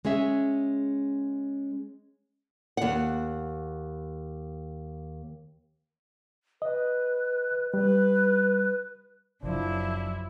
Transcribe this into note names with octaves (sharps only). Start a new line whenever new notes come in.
G#3 C#4 G#4 E5
D#2 F#5
B4 D#5
G3 B4
F#1 F#2 F3 D4 E4